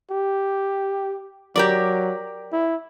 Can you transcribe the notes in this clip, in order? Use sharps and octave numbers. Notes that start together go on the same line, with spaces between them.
G4
F#3 G4 A#4 D5
E4